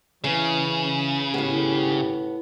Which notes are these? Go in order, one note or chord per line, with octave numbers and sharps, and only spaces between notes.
C#3 E3 C#4
G#1 A2 B3 G4